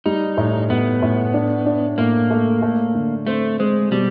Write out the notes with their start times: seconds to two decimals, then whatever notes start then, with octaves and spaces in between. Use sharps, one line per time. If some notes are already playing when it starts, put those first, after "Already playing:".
0.06 G3 D#4
0.37 A2
0.70 A2 B3
1.02 A2
1.34 D4
1.66 D4
1.98 A2 A#3
2.30 A3
2.62 A3
2.95 D3
3.27 A3 C4
3.59 G#3 C4
3.91 B2 G3